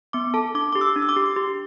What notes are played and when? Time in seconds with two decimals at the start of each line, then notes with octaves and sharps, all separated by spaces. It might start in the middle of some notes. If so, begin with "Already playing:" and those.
0.13 B3 D6
0.34 A4 A5
0.55 D4 D6
0.72 G4 D6
0.81 E6
0.96 D4
1.02 E6
1.09 D6
1.16 G4
1.36 G4